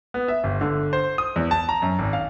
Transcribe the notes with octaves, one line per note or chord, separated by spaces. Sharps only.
B3
E5
G1
D3
C5
D#6
E2
A5
A#5
F#2
G#1
F5